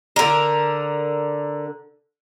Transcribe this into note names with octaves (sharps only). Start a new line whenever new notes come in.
D3 A#4